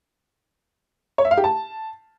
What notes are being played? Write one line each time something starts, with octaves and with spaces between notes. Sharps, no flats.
C#5
E5
F5
G4
A5